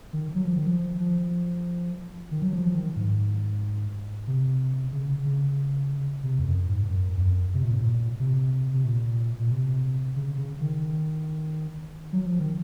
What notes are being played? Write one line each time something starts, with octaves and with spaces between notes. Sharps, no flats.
D#3
F#3
F3
D#3
F3
F3
D#3
F#3
F3
F3
D#3
G#2
C3
C#3
C#3
C3
F2
F#2
G#2
F#2
F2
F#2
C3
A#2
G#2
A#2
C3
C3
A#2
A#2
C3
C#3
C#3
D#3
F#3
F3
D#3